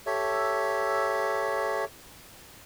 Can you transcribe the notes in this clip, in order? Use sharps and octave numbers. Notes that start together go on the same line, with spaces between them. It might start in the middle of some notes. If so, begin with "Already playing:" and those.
G4 A4 C#5 E5